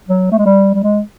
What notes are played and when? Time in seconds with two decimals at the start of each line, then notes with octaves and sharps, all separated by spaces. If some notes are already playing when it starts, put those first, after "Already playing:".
0.08 F#3
0.31 A3
0.38 G#3
0.46 G3
0.74 G3
0.83 G#3